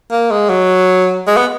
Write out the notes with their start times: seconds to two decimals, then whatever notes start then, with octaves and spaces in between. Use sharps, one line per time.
0.11 A#3
0.31 G#3
0.50 F#3
1.27 G#3
1.37 B3